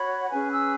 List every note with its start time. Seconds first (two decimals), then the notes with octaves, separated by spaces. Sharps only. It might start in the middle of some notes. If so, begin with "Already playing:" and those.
Already playing: F#4 C#5 B5
0.21 F#5
0.31 C#4 G#4 B4 G#5
0.51 E6